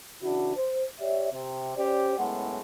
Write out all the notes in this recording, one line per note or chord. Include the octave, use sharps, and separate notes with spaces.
C#3 E3 D4 E4 F#4
C5
G4 C#5 D5 E5
C3
C#4 G4 C5 D5
F#1 F#2 A2 G#3 B3 F#5